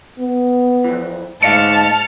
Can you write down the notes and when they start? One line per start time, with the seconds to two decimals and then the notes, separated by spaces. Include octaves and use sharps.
0.19 B3
0.84 F2 E3
1.43 D2 G#2 D#5 F5 A5 F6 C#7